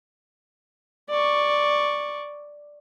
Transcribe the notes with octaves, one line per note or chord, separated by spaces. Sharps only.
D5 C#6